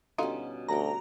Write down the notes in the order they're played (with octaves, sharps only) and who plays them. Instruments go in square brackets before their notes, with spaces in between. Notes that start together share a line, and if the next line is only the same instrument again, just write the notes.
[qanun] B2 G3 C#4 [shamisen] D3 D#4 F4
[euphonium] D2 [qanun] G3 F#5 G5 [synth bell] A#5